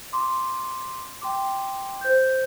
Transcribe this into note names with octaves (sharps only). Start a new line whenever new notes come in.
C6 D6
G5 C6 D6
C5 G6